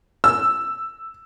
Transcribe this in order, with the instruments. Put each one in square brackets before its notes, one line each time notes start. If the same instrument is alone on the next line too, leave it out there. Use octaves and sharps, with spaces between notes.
[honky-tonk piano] E6